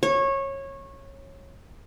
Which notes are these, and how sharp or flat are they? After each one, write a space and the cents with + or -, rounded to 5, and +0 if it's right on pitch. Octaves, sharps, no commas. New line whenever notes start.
C#5 -20